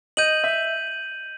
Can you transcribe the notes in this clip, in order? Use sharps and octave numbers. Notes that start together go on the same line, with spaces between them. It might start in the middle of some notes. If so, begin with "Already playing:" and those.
D#5 G6 D#7 F#7
E5